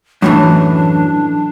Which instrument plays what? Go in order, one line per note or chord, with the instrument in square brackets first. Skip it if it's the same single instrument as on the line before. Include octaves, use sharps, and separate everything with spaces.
[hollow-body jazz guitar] F#2 A2 E3 [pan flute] D4